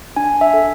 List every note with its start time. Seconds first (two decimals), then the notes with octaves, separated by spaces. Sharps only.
0.16 D4 G#5
0.41 E5
0.53 A4